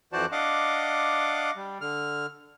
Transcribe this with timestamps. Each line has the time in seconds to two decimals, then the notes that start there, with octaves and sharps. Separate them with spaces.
0.13 F2 E3 F#4 C5 D5 A5
0.32 D4 D#5 F5 F#5 D6
1.56 G3
1.81 D3 F6